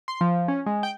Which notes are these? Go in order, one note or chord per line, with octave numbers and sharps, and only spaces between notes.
C6
F3
C#4
G#3
G5